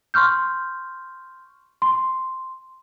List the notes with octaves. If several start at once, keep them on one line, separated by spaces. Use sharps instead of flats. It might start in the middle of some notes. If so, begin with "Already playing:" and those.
C6 C#6 F6 G6
C6